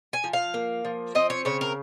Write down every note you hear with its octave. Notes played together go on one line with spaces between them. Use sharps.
G#5
F3
F5
A#3
F3
C4 D#5
C#5
C#3 C#5
A#4